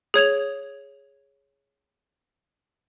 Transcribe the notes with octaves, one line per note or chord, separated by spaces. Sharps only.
G#4 C#5 G#6 F7